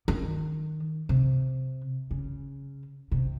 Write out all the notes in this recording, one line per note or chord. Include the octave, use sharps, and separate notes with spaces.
D#3
C3
C#3
C3